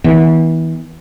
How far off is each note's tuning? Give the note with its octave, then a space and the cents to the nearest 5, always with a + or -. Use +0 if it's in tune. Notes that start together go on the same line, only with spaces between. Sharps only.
E3 -30 B3 -15